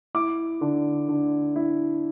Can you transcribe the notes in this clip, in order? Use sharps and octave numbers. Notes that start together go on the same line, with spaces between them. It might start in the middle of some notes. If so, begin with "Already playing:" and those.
E4 D6
D3
D3
E4